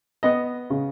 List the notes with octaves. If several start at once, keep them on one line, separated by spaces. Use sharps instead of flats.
B3 D#5
C#3